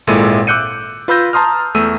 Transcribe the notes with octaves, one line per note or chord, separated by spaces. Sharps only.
G#1 A#2 G#3 E4 A4 D#7
D6 E6 F#6 G6 C#7 D#7
F4 B4 B5 E6 G6 A#6
A5 A#5 C6 D#6 F6
E2 A3 E6 D#7